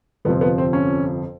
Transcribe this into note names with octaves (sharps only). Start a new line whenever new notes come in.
G1 F2 C3 F3 B3
B3
C4
C#4